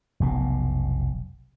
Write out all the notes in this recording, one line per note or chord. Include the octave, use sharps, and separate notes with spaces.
F1 B1 B2